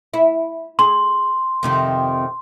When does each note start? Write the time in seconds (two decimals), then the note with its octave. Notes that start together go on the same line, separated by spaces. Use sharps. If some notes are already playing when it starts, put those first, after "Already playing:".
0.14 E4
0.79 G#4 C6
1.63 F2 C3 D#3